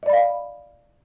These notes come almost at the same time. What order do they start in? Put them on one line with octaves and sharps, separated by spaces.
D#5 D5 B5 F5